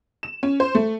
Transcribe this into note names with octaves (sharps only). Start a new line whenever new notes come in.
E7
C#4
C5
A3